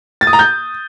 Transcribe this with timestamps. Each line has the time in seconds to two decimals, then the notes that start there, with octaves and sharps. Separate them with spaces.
0.21 A6
0.27 D#6
0.33 A#5
0.39 G6